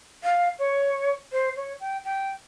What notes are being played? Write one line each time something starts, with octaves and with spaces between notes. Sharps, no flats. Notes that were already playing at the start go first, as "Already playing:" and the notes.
F5
C#5
C5
C#5
G5
G5